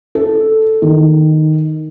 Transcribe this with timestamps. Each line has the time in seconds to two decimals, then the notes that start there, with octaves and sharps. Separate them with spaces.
0.15 A4
0.82 D#3